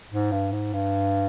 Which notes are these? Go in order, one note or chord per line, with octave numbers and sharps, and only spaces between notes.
G#2
G2
G#2
G2